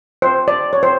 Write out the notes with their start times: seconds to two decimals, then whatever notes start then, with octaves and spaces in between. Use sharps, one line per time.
0.22 C5
0.48 D5
0.73 C#5
0.83 C5